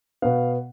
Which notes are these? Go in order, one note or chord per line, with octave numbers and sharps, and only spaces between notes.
B2 B3 F5